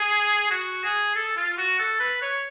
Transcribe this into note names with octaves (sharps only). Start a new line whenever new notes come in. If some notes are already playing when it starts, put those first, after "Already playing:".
Already playing: G#4
F#4
G#4
A4
F4
F#4
A4
B4
C#5